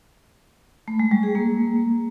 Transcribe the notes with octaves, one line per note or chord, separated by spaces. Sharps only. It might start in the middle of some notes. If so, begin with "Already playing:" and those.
A3
G#3
G3
G#4
A#3